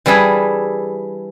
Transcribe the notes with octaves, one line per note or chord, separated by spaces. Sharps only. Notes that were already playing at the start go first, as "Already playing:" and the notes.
E3 G3 D4 E4 G#4